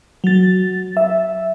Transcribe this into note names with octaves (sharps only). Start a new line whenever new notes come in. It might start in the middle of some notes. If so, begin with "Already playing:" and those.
F#3 A6
E5